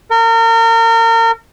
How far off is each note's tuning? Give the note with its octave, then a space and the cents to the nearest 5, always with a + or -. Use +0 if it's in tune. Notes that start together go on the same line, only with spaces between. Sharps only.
A#4 -35